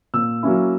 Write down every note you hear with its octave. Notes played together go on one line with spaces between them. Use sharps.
A#2 E6
F#3 A#3 C#4 E4